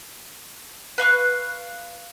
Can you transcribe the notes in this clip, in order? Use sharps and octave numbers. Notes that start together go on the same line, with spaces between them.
B4 F5 C#6 F#6